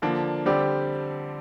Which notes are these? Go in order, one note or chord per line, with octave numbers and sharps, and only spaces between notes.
D3 F3 A#3 D4
D3 G3 C4 G4 D5